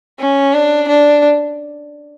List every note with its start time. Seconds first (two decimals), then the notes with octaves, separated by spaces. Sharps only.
0.20 C#4
0.54 D4
0.88 D4